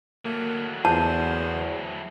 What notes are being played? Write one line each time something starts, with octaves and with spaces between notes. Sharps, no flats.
F#3 A3 A#3
E2 C5 A5